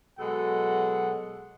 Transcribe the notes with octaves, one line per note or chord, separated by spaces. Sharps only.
B2 F#3 G#3 A4 F#5